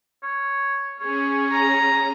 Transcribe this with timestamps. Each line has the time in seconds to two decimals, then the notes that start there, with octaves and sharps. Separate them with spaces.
0.23 C#5
1.00 C#4 G#4 C#5
1.51 A#5